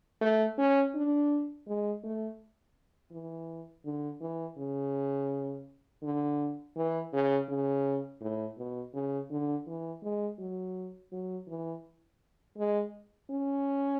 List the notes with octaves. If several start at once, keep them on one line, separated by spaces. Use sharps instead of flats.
A3
C#4
D4
G#3
A3
E3
D3
E3
C#3
D3
E3
C#3
C#3
A2
B2
C#3
D3
E3
G#3
F#3
F#3
E3
G#3
C#4